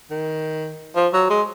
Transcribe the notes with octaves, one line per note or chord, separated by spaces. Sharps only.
D#3
F3
F#3
G#3